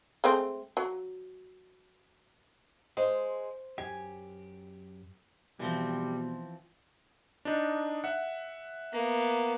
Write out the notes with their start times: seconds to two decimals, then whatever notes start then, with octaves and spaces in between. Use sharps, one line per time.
0.24 G#3 A3 C4
0.77 F#3
2.97 G#3 C5
3.78 F#2 G4 G#5
5.59 B2 E3 F3 G3 C4
7.45 D4 D#4
8.04 E5 F#5
8.93 A#3 B3